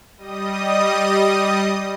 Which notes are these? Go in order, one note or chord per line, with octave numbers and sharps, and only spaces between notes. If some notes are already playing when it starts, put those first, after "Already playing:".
G3 D#5 D#6